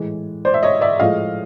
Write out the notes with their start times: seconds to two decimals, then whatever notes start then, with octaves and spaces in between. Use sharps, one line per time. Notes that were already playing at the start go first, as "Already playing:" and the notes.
Already playing: A2 E3 G#3
0.45 C5 D5
0.54 E5
0.63 C#5 D#5
0.81 D5 E5
0.99 A2 F3 G#3 D#5 F5